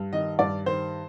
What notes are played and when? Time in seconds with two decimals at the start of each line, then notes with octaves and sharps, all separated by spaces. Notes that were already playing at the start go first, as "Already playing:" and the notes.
Already playing: G2
0.13 D#3 D#5
0.39 G2 D5
0.66 D#3 C5